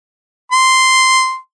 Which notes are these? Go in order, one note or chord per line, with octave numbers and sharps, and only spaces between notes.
C6